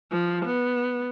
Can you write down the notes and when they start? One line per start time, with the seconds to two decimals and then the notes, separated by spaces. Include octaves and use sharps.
0.12 F3
0.46 B3